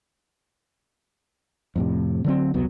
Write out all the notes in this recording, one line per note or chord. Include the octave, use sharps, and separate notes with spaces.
F2 A2 C3
D3 F#3 C4
E1 C2 F#3 B3